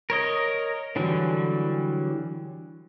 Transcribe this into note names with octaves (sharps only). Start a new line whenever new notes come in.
A#4 C#5 D#5
D3 E3 F#3 G3